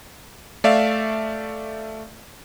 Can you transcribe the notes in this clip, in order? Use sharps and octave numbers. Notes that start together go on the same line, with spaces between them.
A3 D5 E5 F5